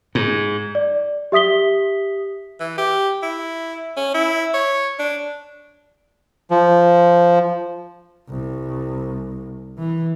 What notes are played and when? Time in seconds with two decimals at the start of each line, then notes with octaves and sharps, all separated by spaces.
0.15 G#2
0.75 D5
1.32 G4 E5 D#6 B6 G7
2.60 E3
2.78 G4
3.23 E4
3.97 C#4
4.14 E4
4.54 C#5
4.99 D4
6.51 F3
8.29 C2
9.78 E3